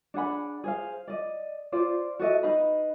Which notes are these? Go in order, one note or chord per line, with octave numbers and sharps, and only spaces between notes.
D4 G#4 F#5 B5
G#4 C5 F5
D5 D#5
F4 C5 D5
F#4 A4 D#5 E5
D#4 B4 F5 B5